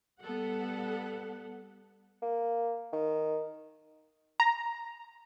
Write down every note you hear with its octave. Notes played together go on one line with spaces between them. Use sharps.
G3 B3 A4 F#5
A#3
D#3
A#5